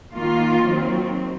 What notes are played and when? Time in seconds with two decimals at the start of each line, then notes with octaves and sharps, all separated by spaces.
0.14 D#3 A#3 F4
0.66 D#3 F#3 C4